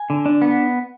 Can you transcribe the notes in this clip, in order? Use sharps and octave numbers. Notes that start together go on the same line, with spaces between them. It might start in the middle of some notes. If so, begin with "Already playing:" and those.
Already playing: G#5
D3
D4
B3